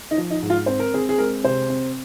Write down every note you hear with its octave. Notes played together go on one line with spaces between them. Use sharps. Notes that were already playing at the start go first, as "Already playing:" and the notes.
D#4
F3
D#4
G#2
F4
C4 C5
A#4
C4 G#4
G#4
G#3 A#4
C3 C5
C4